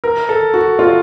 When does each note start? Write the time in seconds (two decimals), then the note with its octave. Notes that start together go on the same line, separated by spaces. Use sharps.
0.04 A#4
0.29 A4
0.54 F#4
0.79 F4